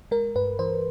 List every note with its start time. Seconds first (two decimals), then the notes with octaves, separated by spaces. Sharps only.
0.11 G#3 A#4
0.35 G2 B4
0.59 E3 C5